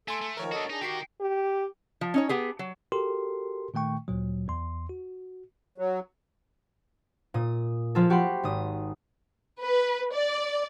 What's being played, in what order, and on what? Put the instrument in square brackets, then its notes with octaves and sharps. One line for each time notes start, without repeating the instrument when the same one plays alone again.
[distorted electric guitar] A3 [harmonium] A4 [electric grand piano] G#5 C6 D7
[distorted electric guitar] A3
[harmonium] D#3 F3 [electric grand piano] A#4 C#5
[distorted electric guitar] D4 F#4 [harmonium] A4 D#5
[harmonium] D4 G#4 [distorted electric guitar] D#4
[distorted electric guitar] D#3 A#4 [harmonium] F#4 G4 [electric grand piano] G5 B6 C7
[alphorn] G4
[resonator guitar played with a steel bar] F3
C#4 D#4 C#5
B3 G4 G#4
F#3
[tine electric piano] F#4 G4 A4 A#4 C6
A#2 D#3 A3 G5 C#6
D2 A#2 F#3
E2 C6
F#4
[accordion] F#3
[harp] A#2 D#6
F3 F4 G#4 A4
F#4 G4 F#5 B5 C6
G#1 D#6
[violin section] B4
D5